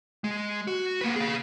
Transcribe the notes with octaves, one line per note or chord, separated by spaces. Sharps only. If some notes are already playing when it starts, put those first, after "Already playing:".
G#3
F#4
A#3 B4
G#4 F5